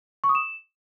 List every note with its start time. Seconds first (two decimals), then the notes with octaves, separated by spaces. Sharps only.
0.24 C#6
0.29 D#6
0.35 E7